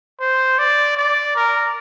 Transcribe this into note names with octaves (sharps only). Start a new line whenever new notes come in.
C5
D5
D5
A#4